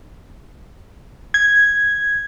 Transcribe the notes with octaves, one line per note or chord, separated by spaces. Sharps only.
G#6